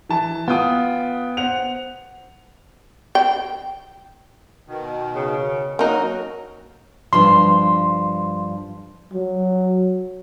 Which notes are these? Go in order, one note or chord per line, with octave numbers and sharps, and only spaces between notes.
E3 A5
B3 F4 G5 D#6
C5 F#5 F7
G5
B2 D#3
C#3
F#3 A#3 D#4 A#4
G2 F3 C6
F#3